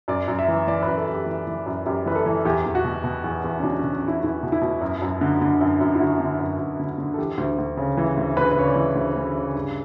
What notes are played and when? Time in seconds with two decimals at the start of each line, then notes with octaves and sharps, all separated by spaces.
0.08 F#2 D5
0.28 F#2
0.39 E5
0.48 E3
0.67 E3 D5
0.82 F#2 B4
0.97 A4
1.07 F#2
1.13 G4
1.26 E3
1.47 E3
1.66 F#2
1.86 F#2 G4
2.06 E3 B4
2.15 A4
2.26 E3
2.45 E2 G4
2.65 E2
2.75 F#4
2.84 B2
3.04 B2
3.24 E2
3.44 E2
3.59 C#4
3.63 B2 D4
3.79 B2 C#4
3.93 C#4
4.03 E2 E4
4.23 E2 E4
4.43 B2
4.52 E4
4.61 B2
4.81 F#2
5.02 F#2
5.21 D3
5.41 D3
5.61 F#2
5.81 F#2
5.95 E4
6.00 D3 F#4
6.20 D3
6.40 F#2
6.59 F#2
6.79 D3
6.98 D3
7.14 A4
7.18 E3 G4
7.37 D2
7.58 D2
7.77 C#3
7.97 E3
8.17 D2
8.36 D2 B4
8.51 B4
8.56 C#3 C#5
8.66 D5
8.76 E3
8.95 D2
9.16 D2
9.35 C#3
9.55 G2